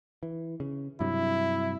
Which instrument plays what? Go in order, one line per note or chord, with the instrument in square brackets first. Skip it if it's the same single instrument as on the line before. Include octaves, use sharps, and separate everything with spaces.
[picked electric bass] E3
C#3
[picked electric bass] G2 C3 F#3 [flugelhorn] E4